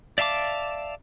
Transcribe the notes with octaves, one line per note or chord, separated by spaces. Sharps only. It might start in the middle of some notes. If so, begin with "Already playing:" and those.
D5 E5 F5 A5 D6